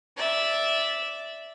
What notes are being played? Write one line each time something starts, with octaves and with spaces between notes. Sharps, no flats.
D5 E5